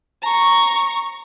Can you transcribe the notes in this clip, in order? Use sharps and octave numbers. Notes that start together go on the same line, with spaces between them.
A#5 C#6